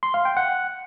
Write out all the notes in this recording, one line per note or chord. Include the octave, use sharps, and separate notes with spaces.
C6
F5
G5
F#5